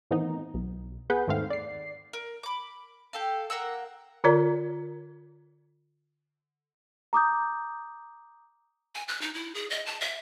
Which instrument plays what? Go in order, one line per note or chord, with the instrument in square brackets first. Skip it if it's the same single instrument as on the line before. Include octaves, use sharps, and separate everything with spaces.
[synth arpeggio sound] A2 D#3 E3 B3 C4 D#4
B1
B3 G#4 B4 F#5 G6
D#2 G#2 A3 C4 F5
D5 C7
[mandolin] A#4
B5 D6
G4 A4 F5
A#3 A#4 F#5 E6
[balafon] D3 F4 A#4 C#5 D5 A#5
[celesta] A#5 D6 D#6 G6
[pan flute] G#5
F#6
D#4
E4
G#4
D#5
A5
E5